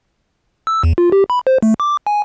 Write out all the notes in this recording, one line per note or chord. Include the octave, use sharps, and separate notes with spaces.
E6
E2
F4
G4
B5
C5
A3
D6
G#5